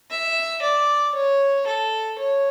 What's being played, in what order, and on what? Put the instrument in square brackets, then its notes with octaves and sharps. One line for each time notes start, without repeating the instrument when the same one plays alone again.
[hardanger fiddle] E5
D5
C#5
A4
C#5